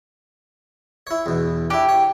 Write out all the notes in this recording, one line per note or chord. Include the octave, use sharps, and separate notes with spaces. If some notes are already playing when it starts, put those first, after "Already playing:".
E4 C#5
E2 B2
D4 E4 G4
C#5